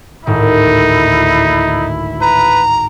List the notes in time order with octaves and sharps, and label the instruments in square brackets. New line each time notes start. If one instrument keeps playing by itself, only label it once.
[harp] G#1 A2 [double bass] D2 E4 [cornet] D#4
[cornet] B4 [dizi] A#5